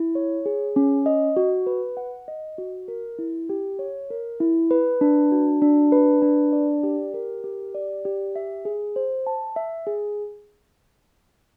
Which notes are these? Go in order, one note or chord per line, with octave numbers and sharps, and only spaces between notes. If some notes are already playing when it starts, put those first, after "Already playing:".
Already playing: E4
C#5
G#4
C#4
D#5
F#4
B4
F#5
D#5
F#4
A#4
E4
G4
C#5
A#4
E4
B4
D4
F#4
D4
B4
D4
D5
G4
A#4
G4
D5
G4
E5
G#4
C5
A5
E5
G#4